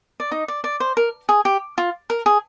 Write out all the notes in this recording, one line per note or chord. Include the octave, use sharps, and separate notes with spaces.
D5
D#4 D#5
D5
D5
C5
A#4
G#4
G4
F4
A#4
G#4